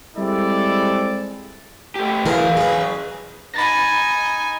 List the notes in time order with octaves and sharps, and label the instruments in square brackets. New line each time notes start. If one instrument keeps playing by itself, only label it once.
[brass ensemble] G3 G#3 C4 E4 A4 D5
[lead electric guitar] A3 G4
[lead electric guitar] F#2 F5 [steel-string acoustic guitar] E3 G#4 A#4
[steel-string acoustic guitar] G#4 B4
[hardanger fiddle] D#4 G#5 [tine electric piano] B5 A6 A#6